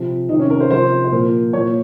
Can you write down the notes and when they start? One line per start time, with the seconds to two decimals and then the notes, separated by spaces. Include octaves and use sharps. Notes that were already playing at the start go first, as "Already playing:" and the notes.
Already playing: C3 F3
0.29 C3 D#3 D#4
0.39 C#4
0.50 A#4
0.60 C5
0.70 C3 F3 C5
1.04 C5
1.11 A#2 F3 A#4
1.53 A#2 F3 C#5